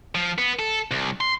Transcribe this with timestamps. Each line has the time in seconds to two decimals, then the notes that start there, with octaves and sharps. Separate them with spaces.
0.15 F3
0.38 B3
0.59 A4
0.91 C2
1.21 C6